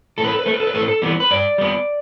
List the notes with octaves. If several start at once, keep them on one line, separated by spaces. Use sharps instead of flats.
A2 A4
B4
A4
B4
A3 A4
B4
A4
B4
A2 A4
B4
A4
E3 G3 B3
B4
G2 D5
G3 B3